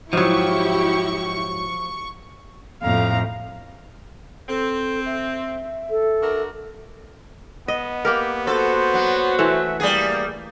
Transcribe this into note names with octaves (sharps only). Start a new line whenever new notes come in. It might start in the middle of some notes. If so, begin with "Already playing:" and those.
G#2 F3 F#3 E4 F#4 G4 C#6
F2 A2 F5 A#5
C4 A4
E5
A4
D4 F#4 A#4
B3 D#5
A#3 G4 A#4
F#4 A4 C5
F#3
E3 A3 E5
G3 A#3 G#4